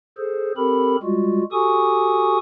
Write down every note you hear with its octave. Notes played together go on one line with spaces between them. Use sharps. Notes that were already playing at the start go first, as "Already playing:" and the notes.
G#4 A4 C5
C4 G4 A4 A#4 B5
G3 G#3 F4 F#4
F#4 G4 A4 G#5 C#6 D#6